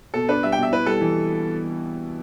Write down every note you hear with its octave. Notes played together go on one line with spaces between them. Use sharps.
B2 A4
D4 B4
G3 E5
G5
B2 E5
E4 B4
G3 A4
E3